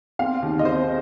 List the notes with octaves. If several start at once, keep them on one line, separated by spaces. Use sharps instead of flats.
C4 F5
D#2
D#5
C4 C5